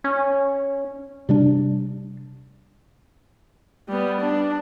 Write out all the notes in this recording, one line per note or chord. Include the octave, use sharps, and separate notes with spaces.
C#4
C3 G3 D4
G3 B3
D4